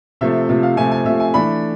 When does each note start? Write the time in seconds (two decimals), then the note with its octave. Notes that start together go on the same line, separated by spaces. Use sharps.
0.21 C3 F3 A3 E5
0.49 C3 F3 A3
0.63 F5
0.77 C3 F3 A3 G#5
0.91 G#5
1.05 C3 F3 A3 E5
1.20 G#5
1.34 E3 A3 D4 B5